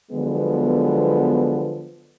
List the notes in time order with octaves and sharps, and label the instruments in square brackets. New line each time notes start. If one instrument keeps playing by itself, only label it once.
[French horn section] D3 F3 F#3 G#3 B3